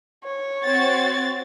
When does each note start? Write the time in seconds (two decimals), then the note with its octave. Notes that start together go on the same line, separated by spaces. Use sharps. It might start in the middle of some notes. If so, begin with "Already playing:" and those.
0.24 C#5
0.64 C4 F#4 A6